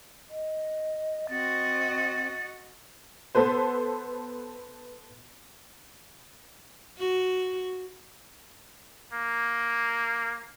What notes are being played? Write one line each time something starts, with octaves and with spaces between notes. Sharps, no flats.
D#5
C4 F#4 D#5 A6
B3 A4 B4 C5
F#4
A#3